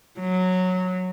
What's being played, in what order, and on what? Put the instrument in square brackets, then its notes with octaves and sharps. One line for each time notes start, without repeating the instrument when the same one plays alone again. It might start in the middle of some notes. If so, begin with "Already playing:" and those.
[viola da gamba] F#3